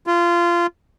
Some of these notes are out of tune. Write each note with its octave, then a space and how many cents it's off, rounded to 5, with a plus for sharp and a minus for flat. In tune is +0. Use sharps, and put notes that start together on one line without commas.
F4 -20